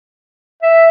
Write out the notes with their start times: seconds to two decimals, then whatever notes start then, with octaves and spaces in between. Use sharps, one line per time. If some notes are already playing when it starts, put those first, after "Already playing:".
0.62 E5